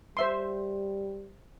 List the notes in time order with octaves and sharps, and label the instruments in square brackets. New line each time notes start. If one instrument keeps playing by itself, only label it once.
[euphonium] G3 [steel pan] C5 E5 C6